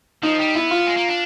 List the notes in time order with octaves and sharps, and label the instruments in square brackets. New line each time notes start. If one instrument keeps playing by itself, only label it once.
[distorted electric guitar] F3 [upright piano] D#4
[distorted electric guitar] G3
[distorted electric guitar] B3 [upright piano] E4
[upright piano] F4
[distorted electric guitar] G#3
A#3
D4